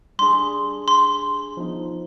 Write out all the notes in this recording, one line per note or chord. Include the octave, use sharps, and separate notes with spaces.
G3 D4 G#4 C6
C6
F3 B3 D#4